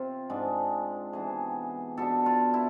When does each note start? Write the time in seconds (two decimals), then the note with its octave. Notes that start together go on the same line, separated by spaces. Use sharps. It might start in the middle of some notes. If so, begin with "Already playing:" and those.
Already playing: C3 C4 F4
0.30 G#2 G#3 D4
1.13 C3 E3 B3 D4 G#4
1.97 B2 B3 D4 A4
2.26 F4
2.54 E4